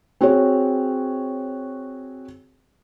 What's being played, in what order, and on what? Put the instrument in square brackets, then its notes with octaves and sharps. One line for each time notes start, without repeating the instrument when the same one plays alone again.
[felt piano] C4 F#4 G#4 C#5